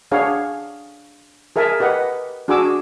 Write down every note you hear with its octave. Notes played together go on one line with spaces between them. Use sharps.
D4 G#4 C#5 F5 F#5
G#4 A#4 E5 G#5 A5
G4 B4 D#5 F#5
D4 F#4 G#4 G#5 D6 E6